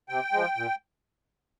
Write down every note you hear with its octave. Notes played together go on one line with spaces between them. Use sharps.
C3 G5
F3 G#3
A#2